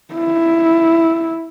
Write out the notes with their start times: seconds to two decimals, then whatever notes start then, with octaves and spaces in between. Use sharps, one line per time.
0.14 E4